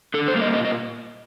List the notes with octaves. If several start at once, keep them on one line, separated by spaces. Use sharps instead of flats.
D3 A4
C5
G3 A#3
D#5
A#2 D#5
D#5